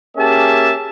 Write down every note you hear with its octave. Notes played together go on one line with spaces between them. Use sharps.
A#3 C#4 G4 G#4 E5 A5